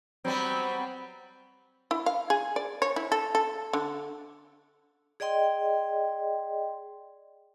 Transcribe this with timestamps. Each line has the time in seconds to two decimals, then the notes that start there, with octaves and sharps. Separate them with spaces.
0.25 F#3 G3 B3 C4
1.91 E4
2.06 F5
2.30 G#4
2.56 D5
2.82 C#5
2.96 E4
3.12 A4
3.35 A4
3.73 D3
5.20 G#4 D5 D#5 G5 C6